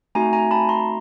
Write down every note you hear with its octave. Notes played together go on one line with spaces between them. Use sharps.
A3 C4 D#4 F#4 G#5 A#5
G#5 A#5
A5 B5
A#5 C6